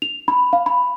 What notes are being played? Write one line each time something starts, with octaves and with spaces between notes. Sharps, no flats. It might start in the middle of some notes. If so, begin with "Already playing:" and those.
F7
B5
F5
B5